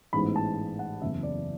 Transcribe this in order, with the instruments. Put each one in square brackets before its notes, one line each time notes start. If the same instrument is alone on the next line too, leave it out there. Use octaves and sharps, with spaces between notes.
[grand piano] A1 G#2 G#3 B3 B5
A5
F#5
F#1 E2 C#3 E5
D5